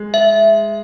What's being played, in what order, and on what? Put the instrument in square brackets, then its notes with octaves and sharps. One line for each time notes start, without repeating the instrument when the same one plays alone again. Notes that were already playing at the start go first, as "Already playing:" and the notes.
Already playing: [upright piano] G#3
[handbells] E5